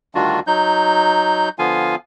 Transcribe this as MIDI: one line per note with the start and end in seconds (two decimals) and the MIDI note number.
0.15 0.40 38
0.15 0.40 51
0.15 0.40 55
0.15 0.40 62
0.15 0.40 65
0.15 0.40 66
0.47 1.49 54
0.47 1.49 63
0.47 1.49 91
1.59 1.96 50
1.59 1.96 53
1.59 1.96 59
1.59 1.96 65
1.59 1.96 77
1.59 1.96 80